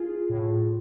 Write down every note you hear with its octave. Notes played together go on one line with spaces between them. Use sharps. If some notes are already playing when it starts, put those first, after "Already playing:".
Already playing: F4 G#4
A2